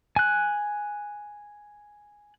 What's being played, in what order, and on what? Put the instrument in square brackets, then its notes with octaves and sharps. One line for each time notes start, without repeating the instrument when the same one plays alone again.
[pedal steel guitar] G#5 F#6